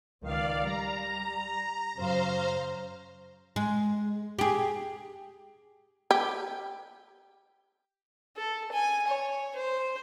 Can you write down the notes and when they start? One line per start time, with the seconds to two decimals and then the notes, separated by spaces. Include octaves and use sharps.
0.23 C#2 D#3 D5 F5
0.63 G3 A#5
1.96 F#2 C#3 C5 F5 A#5
3.56 G#3
4.39 G4 G#4
6.11 G4
8.36 A4
8.71 G#5
9.08 C#5
9.55 C5